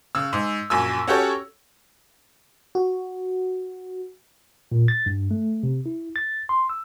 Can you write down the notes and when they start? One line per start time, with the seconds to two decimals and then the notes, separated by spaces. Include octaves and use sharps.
0.15 C#3 E6
0.33 G#2
0.70 A#1 F#2 G#5 E6
1.07 C#4 F#4 G4 A4 C#5
2.75 F#4
4.72 A#2
4.88 A6
5.06 G2
5.31 A3
5.63 C3
5.86 E4
6.16 A6
6.49 C6
6.69 E6